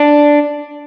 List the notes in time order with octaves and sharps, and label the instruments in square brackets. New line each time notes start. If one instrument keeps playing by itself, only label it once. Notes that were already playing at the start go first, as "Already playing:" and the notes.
Already playing: [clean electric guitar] D4